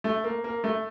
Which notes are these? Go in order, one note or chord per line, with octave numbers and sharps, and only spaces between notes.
A3
A#3
A#3
A3